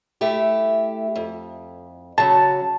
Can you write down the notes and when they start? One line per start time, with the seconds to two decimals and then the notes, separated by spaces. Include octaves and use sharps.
0.21 A3 E4 G4
1.16 F2
2.18 C#3 F#3 A5